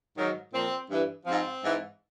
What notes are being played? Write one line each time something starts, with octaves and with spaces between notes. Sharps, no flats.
G#2 D#3 F#3
A#2 F3 C4
G2 E3
G#2 F3 C4
G#2 E3